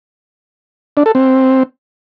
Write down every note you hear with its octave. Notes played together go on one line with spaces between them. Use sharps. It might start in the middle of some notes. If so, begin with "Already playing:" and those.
D4
A4
C4